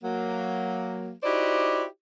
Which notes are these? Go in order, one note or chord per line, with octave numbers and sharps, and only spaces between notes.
F#3 A#3
D#4 E4 F#4 G4 C5 D5